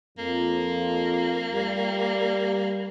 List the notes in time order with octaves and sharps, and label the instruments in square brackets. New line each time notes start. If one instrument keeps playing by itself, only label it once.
[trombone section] F2 F3 [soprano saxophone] A#3
[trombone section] G3